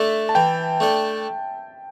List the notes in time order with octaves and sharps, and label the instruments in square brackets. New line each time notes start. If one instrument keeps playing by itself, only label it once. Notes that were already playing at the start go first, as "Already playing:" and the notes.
Already playing: [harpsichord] A3 D4 A4 [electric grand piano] E5
[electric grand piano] A5
[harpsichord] E3 [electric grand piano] G5
[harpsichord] A3 D4 A4